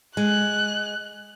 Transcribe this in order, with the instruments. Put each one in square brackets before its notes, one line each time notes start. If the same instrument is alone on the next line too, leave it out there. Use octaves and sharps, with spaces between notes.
[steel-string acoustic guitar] G#3 [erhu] F#6